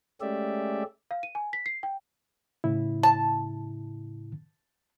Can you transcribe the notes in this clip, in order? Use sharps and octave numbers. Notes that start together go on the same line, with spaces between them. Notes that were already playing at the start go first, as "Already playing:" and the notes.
G#3 A3 C#4 G4 D5 E5
F5
D#7
G#5
B6
C7
G5
A2 C#3 E4
A5